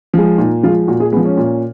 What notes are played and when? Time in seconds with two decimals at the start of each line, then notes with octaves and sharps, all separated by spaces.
0.14 F3 G#3
0.38 A#2 D#4
0.63 F3 F4
0.67 G#3
0.87 A#2 F#4
1.00 G#4
1.12 G#3 B3
1.17 F3
1.25 C#4
1.37 A#2